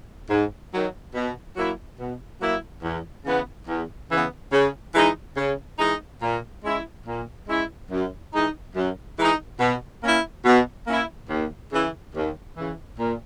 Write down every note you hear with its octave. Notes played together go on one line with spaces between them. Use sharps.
G#2
D#3 F#3
B2
F#3 A#3 E4
B2
F#3 A#3 E4
E2
C#3 E3 B3
E2
C#3 E3 B3
C#3
E3 G#3 D#4
C#3
E3 G#3 D#4
A#2
G#3 C#4 E4
A#2
G#3 C#4 E4
F#2
E3 G#3 D#4
F#2
E3 G#3 D#4
B2
A#3 C#4 E4
B2
A#3 C#4 E4
D#2
C#3 E3
D#2
C#3 E3
A#2